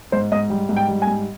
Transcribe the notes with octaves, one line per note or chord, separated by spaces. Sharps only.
G#2 C5
G#2 D#5
G3
G#2
G5
G3
G#5
G#2